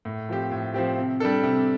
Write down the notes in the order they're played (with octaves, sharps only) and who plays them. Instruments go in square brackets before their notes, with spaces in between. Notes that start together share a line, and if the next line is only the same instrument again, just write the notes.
[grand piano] A2
F3 C4 G4
A2
F3 C4 G4
C3
G3 D4 A4
C3